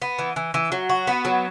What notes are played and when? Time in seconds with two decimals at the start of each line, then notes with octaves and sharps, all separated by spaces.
0.02 B3
0.19 E3
0.36 E3
0.54 E3
0.72 F#3
0.89 F#4
1.07 B3
1.25 F#3